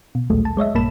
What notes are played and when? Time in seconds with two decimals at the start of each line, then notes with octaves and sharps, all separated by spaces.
0.15 B2
0.30 A#1 D#2 F#3 G#3 A3
0.45 A5
0.57 G#3 C#5 D#5 E5
0.75 A#1 G2 A#3 A5 B5 E7